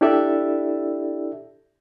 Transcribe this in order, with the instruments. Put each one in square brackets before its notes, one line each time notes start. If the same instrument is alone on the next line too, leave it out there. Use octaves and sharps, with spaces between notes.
[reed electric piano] D4 E4 G4 A4 D5 E5